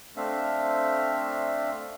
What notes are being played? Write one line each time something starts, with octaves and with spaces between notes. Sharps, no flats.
A3 C4 D4 E5 F5